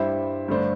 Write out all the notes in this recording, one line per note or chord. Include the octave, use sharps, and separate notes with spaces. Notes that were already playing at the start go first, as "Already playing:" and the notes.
Already playing: G2 G3 E4 C5 E5
G2 D3 A3 D4 C5